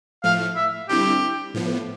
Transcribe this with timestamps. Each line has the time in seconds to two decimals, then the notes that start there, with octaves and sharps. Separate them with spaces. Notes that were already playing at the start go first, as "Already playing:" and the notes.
0.24 A2 F3 A3 F5
0.56 E5
0.89 D3 G3 C4 E4 G4
1.54 A2 F3 B3